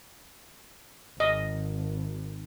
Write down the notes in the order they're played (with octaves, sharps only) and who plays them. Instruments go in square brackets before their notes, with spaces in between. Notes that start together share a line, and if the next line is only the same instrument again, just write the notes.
[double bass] G#1 [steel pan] D#5